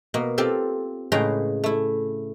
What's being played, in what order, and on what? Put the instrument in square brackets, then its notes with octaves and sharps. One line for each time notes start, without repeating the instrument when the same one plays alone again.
[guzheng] B2 A#3
C4 F4 G4 A4
A2 C#3 G#3 B4 G5 A#5
A3 E4